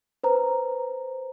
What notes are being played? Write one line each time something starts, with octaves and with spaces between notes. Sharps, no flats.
B4 C5 A#5